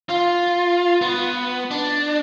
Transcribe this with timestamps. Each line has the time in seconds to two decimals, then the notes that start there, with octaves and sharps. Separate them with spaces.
0.09 F4
1.02 B3
1.71 D4